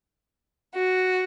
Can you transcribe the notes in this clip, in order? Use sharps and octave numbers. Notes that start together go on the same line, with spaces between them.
F#4